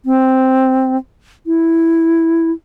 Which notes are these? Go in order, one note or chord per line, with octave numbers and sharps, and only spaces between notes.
C4
E4